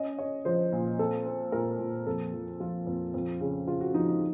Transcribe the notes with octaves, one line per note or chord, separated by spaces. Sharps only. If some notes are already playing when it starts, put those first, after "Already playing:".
Already playing: C#4 D#5
C#4 C#5
F3 C5
A#2
C4 A4
C4
A#2 A#4
A#2
F2 A4
F3
F3 F4
F2
F2
C#3
C#3 F4
F#4
F3 D#4
D#4